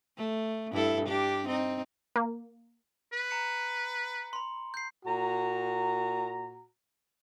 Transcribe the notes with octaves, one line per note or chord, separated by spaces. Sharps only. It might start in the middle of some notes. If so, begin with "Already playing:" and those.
A3
G2 E4 A4
D4 G4
C4 D#4
A#3
B4
A#5 C#7
B5 C6
G6 C7
A#2 F#4 A#5